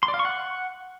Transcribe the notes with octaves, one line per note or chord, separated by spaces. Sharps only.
C6
D5
F5
C#6
F#5